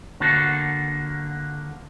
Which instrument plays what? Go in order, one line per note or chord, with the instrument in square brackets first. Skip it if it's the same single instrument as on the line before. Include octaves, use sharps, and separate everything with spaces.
[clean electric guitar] D3 A#3 F#4 A4